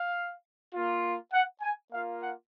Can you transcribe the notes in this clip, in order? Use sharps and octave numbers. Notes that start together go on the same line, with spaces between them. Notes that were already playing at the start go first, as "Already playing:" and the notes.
Already playing: F5
A#3 F4
F#5
G#5
A#3 F4 F5
F#5